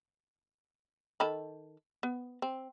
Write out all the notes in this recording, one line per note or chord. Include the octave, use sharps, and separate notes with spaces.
D#3 A4 B5
B3
C4